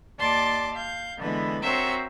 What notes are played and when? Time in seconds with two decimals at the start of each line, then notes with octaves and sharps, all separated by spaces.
0.19 D#2 D5 A5 C6 D6
0.73 F5 G6
1.19 D3 E3 G#3 B3 B4
1.64 C4 F#4 A#4 C5 C#5 E5